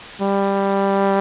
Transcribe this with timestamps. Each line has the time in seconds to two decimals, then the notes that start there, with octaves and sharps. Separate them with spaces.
0.22 G3